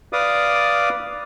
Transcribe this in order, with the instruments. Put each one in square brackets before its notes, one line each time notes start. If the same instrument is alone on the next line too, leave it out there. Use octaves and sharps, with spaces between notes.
[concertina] B4 D5 F5 D6 D#6